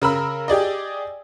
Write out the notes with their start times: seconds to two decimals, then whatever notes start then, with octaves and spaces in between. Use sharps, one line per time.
0.02 C#3 A#4 B5 E6
0.48 G4 G#4 D5 D#5